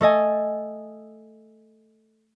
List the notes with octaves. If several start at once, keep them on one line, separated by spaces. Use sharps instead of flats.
A3 A4 D#5 G#5